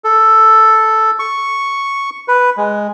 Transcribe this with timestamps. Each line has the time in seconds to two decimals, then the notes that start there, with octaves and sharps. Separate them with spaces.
0.04 A4
1.19 C#6
2.28 B4
2.57 G#3